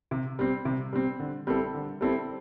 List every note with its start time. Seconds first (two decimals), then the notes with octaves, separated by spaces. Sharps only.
0.11 C3
0.39 G3 C4
0.65 C3
0.93 G3 C4
1.20 D3
1.47 G3 C4 E4 A4
1.74 D3
2.01 G3 C4 E4 A4